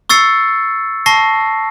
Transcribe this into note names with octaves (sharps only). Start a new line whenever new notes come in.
C#6 E6 A6 C7 C#7
A5 C#6 A#6 C7